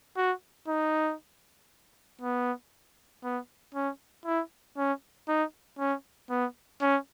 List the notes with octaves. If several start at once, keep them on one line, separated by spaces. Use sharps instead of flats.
F#4
D#4
B3
B3
C#4
E4
C#4
D#4
C#4
B3
C#4